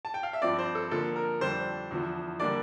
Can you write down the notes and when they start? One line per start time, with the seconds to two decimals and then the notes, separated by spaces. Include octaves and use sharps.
0.05 A5
0.14 G5
0.23 F5
0.33 E5
0.42 G2 F3 C4 D5
0.58 C5
0.75 A4
0.91 D3 F3 A#3 A4
1.16 A#4
1.41 F2 D3 G3 D4 C5
1.91 E2 D3 F3
2.40 D3 G3 A#3 D4 D5